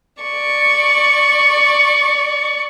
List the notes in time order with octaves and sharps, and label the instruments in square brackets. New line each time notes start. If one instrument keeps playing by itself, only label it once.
[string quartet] D5 C#6